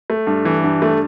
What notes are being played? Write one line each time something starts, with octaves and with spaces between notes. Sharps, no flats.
A3
G2
E3
G2
A3